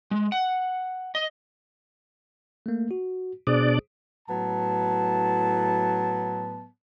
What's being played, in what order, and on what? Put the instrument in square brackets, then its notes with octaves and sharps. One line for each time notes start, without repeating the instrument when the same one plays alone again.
[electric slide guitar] G#3
F#5
D#5
[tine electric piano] A3 A#3
F#4
[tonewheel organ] B2 D4 D5 [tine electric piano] G#4 C5 D#6
[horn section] A2 F#3 B3 A5